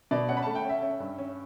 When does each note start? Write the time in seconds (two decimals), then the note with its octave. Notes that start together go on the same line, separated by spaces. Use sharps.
0.11 B2 D5
0.29 C#4 F#5
0.37 B5
0.43 A3 A5
0.55 G5
0.65 C#4 E5
0.82 C#4
1.00 G2
1.18 C#4